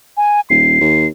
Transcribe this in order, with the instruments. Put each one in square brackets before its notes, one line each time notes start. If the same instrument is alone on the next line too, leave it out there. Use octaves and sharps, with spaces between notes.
[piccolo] G#5
[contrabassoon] D#1 [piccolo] C7
[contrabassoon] D#2